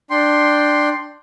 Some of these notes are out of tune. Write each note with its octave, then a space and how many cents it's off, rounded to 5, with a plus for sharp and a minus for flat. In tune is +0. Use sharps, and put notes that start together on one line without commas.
D4 +10 G5 +0 C6 +5